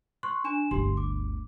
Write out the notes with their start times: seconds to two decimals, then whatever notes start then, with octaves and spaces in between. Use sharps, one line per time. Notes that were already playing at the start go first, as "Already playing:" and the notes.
0.23 C6 C#6 F#6
0.44 D4 G#5 E7
0.71 G1 D2 G4 C6
0.97 D6